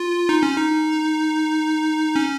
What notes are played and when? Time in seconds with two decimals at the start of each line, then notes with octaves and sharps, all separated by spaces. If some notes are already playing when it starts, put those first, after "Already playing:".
Already playing: F4
0.29 D#4
0.43 C#4
0.57 D#4
2.16 C#4